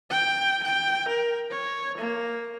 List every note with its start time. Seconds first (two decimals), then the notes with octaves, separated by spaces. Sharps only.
0.10 G5
0.63 G5
1.08 A#4
1.50 C#5
1.98 A#3